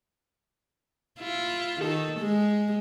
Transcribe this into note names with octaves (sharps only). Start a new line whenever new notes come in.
E4 F4
D#3 A4
G#3